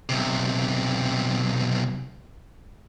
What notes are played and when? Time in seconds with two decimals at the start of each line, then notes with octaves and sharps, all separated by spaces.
0.09 B1 C3